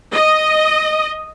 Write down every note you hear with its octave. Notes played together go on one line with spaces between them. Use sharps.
D#5